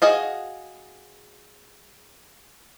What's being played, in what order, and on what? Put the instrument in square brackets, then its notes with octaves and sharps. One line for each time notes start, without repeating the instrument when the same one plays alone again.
[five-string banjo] F#4 G#4 D#5 F5